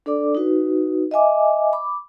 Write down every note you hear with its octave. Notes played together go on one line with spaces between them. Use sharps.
D4 A4 D5 D6
D#4 F#4 B4
D#5 E5 G#5 D6
B5 D6